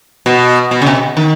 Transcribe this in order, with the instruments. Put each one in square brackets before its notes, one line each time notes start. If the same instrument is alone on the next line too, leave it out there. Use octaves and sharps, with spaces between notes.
[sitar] B2
B2
C#3
B2
D#3